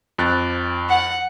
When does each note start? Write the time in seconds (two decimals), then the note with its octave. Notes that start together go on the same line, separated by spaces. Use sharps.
0.19 F2 F#6 A6
0.89 F#5